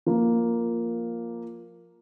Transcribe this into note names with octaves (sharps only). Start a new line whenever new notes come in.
F3 A#3